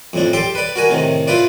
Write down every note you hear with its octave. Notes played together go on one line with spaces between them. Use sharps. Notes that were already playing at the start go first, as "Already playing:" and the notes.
F2 A2 D4
G4 A4 G5 C6
B4 D5
F#4 A#4 G#5
A2 C3 D#3
E4 F4 B4 D5